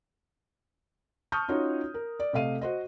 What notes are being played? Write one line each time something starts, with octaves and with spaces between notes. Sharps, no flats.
A5 C#6 D#6 F6 G6
C#4 D#4 F4 F#4 C#5
A#4
D5
C3 A3 D#5 F5 D#7
F#4 C5 D#5